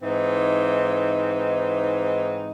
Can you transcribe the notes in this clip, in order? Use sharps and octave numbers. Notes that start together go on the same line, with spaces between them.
G#2 E3 C4 D#4